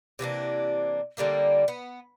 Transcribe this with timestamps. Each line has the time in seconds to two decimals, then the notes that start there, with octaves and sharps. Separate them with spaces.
0.19 C3 E3 A#3 D4
1.17 D3 G3 A#3 E4
1.68 B3